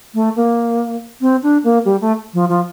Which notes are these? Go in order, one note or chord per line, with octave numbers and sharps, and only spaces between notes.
A3
A#3
C4
D4
A#3
G3
A3
F3
F3